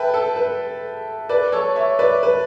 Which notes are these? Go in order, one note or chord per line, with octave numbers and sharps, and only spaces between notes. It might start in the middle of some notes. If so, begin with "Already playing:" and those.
Already playing: B4 E5 G5 A5
A4
B4
B4 D5
A4 C#5
C#5 E5
B4 D5
B4